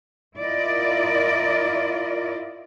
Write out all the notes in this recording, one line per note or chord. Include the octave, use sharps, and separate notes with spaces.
E4 F4 A#4 D5 D#5